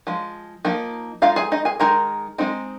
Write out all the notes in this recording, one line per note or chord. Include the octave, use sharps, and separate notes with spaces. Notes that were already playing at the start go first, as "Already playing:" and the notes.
F3 G#3
F3 A#3 D#4
G#3 D#4 F4 F5
G#4 G#5
D#4 D#5
G#4 G#5
D#3 G#3 D#4 A#4 A#5
G#3 C4 D#4